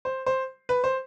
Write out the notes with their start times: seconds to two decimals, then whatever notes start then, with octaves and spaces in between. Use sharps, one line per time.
0.05 C5
0.26 C5
0.69 B4
0.84 C5